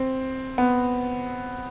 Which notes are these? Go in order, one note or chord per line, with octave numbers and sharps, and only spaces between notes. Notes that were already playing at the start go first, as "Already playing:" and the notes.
Already playing: C4
B3